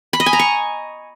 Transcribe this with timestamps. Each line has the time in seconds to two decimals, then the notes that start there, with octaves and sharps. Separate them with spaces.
0.13 B5
0.20 D#5
0.26 G#5
0.33 A#5
0.39 C#6